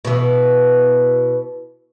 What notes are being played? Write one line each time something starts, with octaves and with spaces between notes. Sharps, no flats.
B2 E3